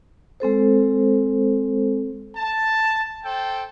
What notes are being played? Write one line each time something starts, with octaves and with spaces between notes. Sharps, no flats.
G#3 C4 A4 C5
A5
A4 C5 G5